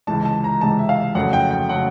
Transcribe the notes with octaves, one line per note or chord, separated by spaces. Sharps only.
C#2 C3 E3 G#3 A5
A5
A#5
C#2 C3 E3 G#3 A5
E5
F5
F#1 F2 C#3 F#3 A3 F#5
G5
G5
C#3 F#3 A3 F#5